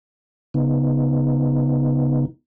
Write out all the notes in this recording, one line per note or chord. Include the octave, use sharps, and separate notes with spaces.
C#3 B3 D#4